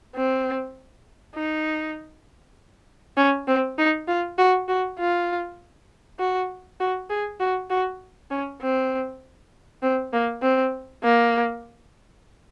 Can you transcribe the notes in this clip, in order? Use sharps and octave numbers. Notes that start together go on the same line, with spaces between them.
C4
D#4
C#4
C4
D#4
F4
F#4
F#4
F4
F#4
F#4
G#4
F#4
F#4
C#4
C4
C4
A#3
C4
A#3